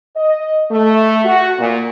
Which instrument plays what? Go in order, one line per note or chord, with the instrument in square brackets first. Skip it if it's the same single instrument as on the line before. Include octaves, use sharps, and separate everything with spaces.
[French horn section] D#5
A3
F#4
A#2